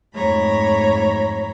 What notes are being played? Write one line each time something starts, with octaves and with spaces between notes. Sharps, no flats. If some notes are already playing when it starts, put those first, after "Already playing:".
F2 G#2 A3 C#5 A#5 B5